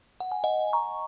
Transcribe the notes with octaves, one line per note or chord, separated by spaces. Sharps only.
F#5
G#5
D#5 F#5
A#5 C#6